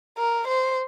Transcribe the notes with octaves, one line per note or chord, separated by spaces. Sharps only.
A#4
C5